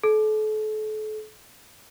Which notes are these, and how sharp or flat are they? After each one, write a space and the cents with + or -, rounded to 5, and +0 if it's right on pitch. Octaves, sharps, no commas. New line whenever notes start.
A4 -35